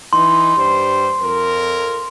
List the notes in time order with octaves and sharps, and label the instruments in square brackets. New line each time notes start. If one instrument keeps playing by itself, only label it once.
[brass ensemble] E3 D#4 [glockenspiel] C6
[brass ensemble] G2 G3 C5
F2 A#4